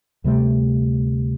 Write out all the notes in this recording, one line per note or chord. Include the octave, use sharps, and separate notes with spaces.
D2 C3 G3 A3